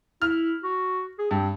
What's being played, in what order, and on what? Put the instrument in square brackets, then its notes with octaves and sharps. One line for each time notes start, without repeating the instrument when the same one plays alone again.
[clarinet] E4 [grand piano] F6
[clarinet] F#4
G#4
[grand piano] G2 [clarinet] C4